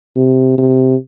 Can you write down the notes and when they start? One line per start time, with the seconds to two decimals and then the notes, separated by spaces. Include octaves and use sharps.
0.16 C3
0.58 C3